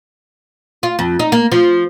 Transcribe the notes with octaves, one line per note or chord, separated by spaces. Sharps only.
F4
F2
D#4
A#3
F3